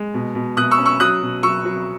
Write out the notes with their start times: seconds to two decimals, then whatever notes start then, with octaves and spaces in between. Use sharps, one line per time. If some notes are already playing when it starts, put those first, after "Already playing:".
Already playing: G#3
0.14 B2
0.35 B2
0.57 B2 D#6 F#6
0.71 C#6 E6
0.78 C#4
0.86 C#6 E6
1.00 F#3 D#6 F#6
1.22 B2
1.43 F#3 C#6 E6
1.65 F#3